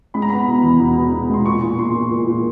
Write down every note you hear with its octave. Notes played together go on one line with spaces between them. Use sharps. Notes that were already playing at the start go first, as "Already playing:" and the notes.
G#3 B5
A#5
B3 B5
B2
E2
B2
B2
B2
G#3 C6
A#2 C#6
A#2
A#2 C6
A#2
A#2
A#2